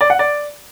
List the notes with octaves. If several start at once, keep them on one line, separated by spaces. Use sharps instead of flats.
D5
F#5
D5